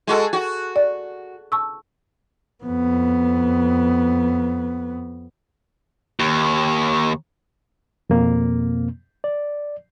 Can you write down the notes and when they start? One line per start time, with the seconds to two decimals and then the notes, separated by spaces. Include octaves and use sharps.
0.07 G#3 F#4 A4
0.33 F#4
0.76 D5
1.52 A5 C#6 E6
2.64 F2 B3
6.20 D#2
8.10 F2 B2 A#3 C4
9.24 D5